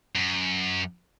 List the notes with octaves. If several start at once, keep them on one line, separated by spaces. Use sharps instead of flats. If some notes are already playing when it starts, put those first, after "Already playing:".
F#2